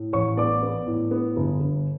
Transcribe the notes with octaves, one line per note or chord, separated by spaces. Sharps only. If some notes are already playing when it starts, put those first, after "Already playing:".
Already playing: A2
A1 C#5 C#6
B3 D5 D6
B3
A2
B3
G1
G1